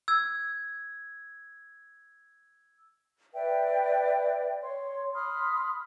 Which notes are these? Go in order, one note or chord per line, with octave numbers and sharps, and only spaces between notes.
E6 G#6
B4 D5 E5 G5
C#5 C6
B5 C6 D#6 F6